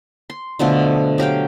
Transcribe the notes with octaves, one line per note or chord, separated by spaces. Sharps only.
C6
B2 D3 F3 A3
F#3 G4 F5 G5